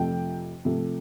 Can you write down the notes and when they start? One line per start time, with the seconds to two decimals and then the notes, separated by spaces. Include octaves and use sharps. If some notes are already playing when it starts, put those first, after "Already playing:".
Already playing: F2 C3 F3 A3 G5
0.65 C3 F3 A3